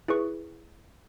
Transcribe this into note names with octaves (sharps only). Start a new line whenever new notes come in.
E4 G#4 B4 C#6